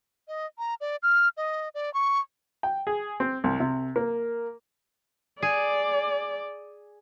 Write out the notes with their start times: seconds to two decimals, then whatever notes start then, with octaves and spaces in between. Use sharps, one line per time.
0.28 D#5
0.58 A#5
0.81 D5
1.03 F6
1.37 D#5
1.75 D5
1.94 C#6
2.63 G5
2.87 G#4
3.20 C4
3.44 C2
3.60 C3
3.96 A#3
5.42 G#4 D5